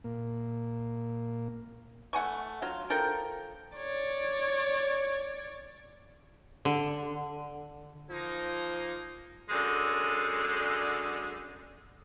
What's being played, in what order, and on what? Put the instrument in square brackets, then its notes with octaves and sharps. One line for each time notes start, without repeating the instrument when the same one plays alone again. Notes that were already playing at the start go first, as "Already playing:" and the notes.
[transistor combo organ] A#2 A#3
[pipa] A3 F#5 G#5 C#6
F#3 F4
F3 A4 A#4 G5
[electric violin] C#5 D5
[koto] D3
[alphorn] F3 [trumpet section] A#3 D#4
[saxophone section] F#2 D3 G#3